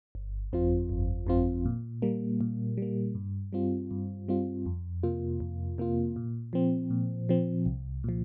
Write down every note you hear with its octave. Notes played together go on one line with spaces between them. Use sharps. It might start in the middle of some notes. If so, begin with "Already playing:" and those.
G1
F2 F3 C4 F4
G1
F2 F3 C4 F4
A#2
G3 A#3
A#2
G3 A#3
G2
G3 C4 F4
G2
G3 C4 F4
F2
C3 A#3 F4
F2
C3 A#3 F4
A#2
F3 C4
A#2
F3 C4
C2
A#2 F3